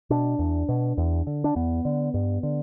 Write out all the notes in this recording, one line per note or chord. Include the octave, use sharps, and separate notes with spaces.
B2 D4
E2
B2
E2
D3
D4
E2 B3
D3
G2
D3